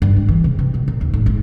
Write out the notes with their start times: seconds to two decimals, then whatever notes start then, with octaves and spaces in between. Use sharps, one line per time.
0.02 G2
0.16 G#3
0.28 E3
0.44 C3
0.59 C3
0.74 B2
0.88 A#2
1.01 D#2
1.14 A2
1.26 G#1